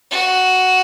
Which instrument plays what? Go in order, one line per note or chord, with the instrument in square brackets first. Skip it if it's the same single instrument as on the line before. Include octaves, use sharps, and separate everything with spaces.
[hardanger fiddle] F#4